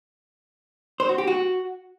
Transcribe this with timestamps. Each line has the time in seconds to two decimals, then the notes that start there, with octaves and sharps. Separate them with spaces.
1.00 C5
1.09 F#4
1.18 G4
1.27 F#4